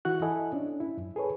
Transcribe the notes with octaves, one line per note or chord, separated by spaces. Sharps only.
E3 E4 F#4 F#6
E4 A4 D#5 G#5
C#4 D4
E4
F#2
G#4 A4 B4 C#5